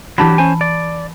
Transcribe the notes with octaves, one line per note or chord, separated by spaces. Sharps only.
E3 F#3 D4 G4 A5 B5
C#4 C5 G#5
D5